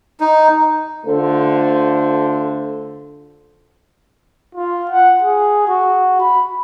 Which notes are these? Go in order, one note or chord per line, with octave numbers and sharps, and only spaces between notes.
D#4
D3 A3 F4 A4 C5
F4
F#5
G#4
F#4
B5